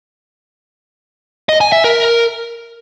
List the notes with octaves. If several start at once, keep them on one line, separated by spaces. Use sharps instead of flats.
D#5
G#5
E5
A#4